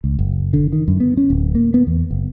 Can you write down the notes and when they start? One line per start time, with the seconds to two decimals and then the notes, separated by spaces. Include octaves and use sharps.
0.04 C#2
0.19 F#1
0.53 D3
0.73 D#3
0.88 F#2
1.00 B3
1.17 C#4
1.30 D1
1.55 A#3
1.74 B3
1.87 E2
2.11 F#1